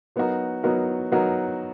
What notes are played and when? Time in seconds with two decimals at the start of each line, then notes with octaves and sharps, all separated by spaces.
0.16 F#3 B3 D#4 F#4 A#4
0.63 F#3 B3 D#4 F#4 A#4
1.12 F#3 B3 D#4 F#4 A#4